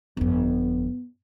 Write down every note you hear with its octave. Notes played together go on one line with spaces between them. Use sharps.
G1 F2 B3